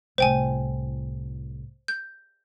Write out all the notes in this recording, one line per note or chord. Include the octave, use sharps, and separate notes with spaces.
C2 A2 C5 G5 G#5
G6